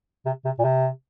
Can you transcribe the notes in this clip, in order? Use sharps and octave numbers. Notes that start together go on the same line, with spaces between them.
C3
C3
A#2
C3